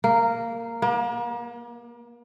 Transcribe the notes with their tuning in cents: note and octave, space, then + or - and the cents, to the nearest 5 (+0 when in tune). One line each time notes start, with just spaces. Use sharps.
A#3 -10
A#3 +40